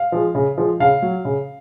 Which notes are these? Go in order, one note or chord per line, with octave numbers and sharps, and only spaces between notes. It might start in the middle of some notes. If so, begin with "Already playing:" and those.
Already playing: F5
F3 G#3
C#3
F3 G#3
C#3 F5
F#3
C#3